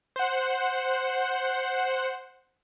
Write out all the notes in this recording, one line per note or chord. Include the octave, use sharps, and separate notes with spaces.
C5 F#5